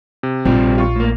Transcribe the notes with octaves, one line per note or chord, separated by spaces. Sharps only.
C3
A#1 F3 G3 C4
F4 C#6
A2 A#3